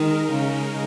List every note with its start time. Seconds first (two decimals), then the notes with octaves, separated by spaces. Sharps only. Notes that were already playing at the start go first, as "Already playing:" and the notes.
Already playing: D#3 G#3 D#4 A#4
0.32 C#3